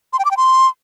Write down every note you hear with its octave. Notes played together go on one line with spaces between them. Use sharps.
C6
G5
D6
G5
C6